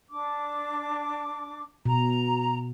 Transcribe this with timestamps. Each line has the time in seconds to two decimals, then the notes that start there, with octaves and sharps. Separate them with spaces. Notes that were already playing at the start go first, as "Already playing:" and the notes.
0.09 D4 D6
1.86 B2 A#5